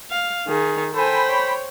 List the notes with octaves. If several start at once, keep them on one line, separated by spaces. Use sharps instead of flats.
F5
D#3 G#4
A4 C5 G5 G#5 B5
C#5